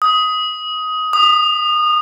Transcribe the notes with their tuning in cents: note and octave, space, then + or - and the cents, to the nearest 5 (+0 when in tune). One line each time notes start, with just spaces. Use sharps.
D#6 +15
D#6 -25